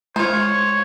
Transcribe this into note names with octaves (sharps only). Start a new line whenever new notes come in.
G#3 F4 C5 C#5